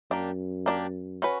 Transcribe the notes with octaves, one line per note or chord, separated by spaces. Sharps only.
F#2 A#3 D4 G4
A#3 D4 G4
C#4 F#4 B4